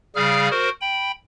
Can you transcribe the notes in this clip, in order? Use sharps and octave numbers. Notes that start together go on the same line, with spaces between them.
C#3 G3 G#4 F5 F6
F#4 A#4 C5
G5 B5